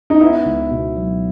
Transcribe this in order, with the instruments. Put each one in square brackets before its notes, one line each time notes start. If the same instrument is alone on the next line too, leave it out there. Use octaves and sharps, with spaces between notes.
[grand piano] D#4
[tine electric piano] B3 [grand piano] E4
[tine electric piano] C#2
B2
F#3